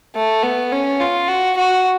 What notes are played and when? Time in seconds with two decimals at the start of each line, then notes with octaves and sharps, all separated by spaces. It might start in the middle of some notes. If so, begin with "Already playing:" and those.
0.15 A3
0.43 B3
0.71 C#4
1.00 F4
1.28 F#4
1.57 F#4